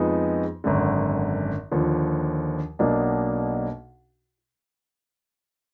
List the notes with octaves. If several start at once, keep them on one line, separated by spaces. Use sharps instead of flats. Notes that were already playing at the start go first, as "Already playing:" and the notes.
Already playing: F2 F3 G#3 B3 D#4
G#1 F#2 D3
D#2 D3 F3
B1 B2 A#3 D4